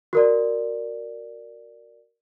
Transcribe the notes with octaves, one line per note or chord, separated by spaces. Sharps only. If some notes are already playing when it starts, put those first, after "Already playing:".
F#4 A#4 D5